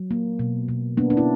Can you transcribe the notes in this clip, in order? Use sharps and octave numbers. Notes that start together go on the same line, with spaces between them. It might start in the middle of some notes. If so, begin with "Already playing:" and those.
Already playing: F#3
A#3
B2
B2
A#3 B3 D4
D4
C#4 E4